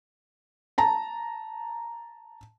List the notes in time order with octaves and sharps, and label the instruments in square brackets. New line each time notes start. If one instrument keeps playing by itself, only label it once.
[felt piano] A5 A#5